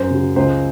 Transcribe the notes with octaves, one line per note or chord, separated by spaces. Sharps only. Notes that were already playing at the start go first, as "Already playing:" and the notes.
Already playing: F#2 C5
C#3 F#3
C#2 C5